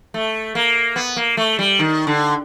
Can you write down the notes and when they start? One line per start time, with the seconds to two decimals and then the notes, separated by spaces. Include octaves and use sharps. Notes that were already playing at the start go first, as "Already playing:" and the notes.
0.14 A3
0.55 A#3
0.96 B3
1.16 A#3
1.37 A3
1.59 G3
1.79 D#3
2.07 D3